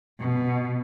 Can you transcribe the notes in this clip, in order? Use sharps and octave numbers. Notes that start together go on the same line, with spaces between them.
B2